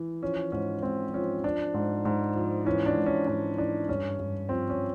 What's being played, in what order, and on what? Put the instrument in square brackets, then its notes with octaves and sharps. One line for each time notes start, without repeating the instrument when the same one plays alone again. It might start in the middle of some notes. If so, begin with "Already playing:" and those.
Already playing: [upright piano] E3
F3 C#4
G#2 C#4
G#2 C4
F3 C#4
F3 D4
G#2
G#2
F3
E3 C#4
D4
G#2
C#4
G#2 D4
E3 D4
G2 C#4
G2
F3 C4
C#4